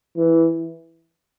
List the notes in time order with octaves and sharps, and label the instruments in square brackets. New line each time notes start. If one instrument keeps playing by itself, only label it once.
[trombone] E3